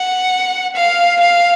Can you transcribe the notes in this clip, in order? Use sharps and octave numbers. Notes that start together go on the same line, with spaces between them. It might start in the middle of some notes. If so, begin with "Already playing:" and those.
Already playing: F#5
F5
F5